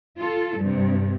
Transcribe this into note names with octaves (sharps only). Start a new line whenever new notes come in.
F4 A4
G2 C3